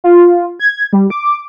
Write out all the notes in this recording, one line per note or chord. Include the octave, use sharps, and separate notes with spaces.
F4
G#6
G3
D6